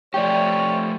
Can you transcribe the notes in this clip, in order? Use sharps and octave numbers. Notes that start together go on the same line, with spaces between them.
F3 A3 G4 C#5 D5 G5